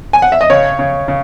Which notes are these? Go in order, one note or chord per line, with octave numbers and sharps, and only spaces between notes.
G#5
F#5
E5
D#5
C#3 C#5
C#3
C#3